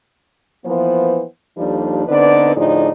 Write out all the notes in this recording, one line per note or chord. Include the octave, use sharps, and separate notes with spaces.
E3 F3 A#3 B3 C5
D#2 F3 G3 D4 D#4 A4
D3 B3 C4 D#4 B4 D5
A2 D3 F3 D#4 G#4 D5